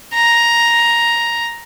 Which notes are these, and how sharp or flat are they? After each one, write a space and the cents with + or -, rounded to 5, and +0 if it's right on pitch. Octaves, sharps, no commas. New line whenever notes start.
A#5 +5